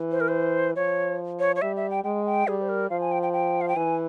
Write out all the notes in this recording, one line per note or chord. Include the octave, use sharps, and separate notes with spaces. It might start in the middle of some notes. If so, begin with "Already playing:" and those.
Already playing: E3
C5
A#4
C5
F3 C#5
C#5
C#5
G3 E5
E5
G5
G#3 G5
G5
G3 G#4
C5
A#4
F3 F5
G#5
G5
G5
G5
F5
G5
E3 G#5